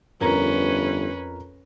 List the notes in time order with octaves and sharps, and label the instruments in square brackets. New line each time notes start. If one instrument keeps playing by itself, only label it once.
[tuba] G1 [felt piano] F2 A#4 A#5 [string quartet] C#4 B4